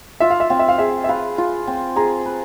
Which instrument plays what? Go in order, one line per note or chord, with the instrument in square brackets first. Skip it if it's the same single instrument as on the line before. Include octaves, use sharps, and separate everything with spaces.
[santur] F4 [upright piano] E5
[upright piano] F5
E5
[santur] C4 [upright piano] F5
[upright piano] E5
F5
[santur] G#4 [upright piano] E5
[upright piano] E5
[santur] B4 [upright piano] F5
[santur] F4
C4
[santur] G#4 [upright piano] A#5
[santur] B4